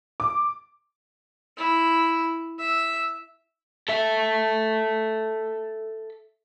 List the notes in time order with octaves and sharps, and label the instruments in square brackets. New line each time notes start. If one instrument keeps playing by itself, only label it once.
[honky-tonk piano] D6
[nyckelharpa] E4
E5
[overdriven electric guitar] A4 E5